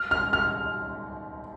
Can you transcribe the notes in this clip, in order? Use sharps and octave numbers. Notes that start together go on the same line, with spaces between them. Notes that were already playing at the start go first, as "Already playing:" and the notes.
Already playing: F6
F6
F6